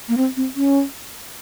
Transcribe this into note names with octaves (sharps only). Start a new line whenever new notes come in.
A#3
C4
C4
C#4